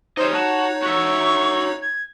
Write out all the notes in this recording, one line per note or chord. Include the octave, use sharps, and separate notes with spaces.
G3 D#4 C5 C#5 D#5
F#4 A5
F#4 E5 C#6
G#6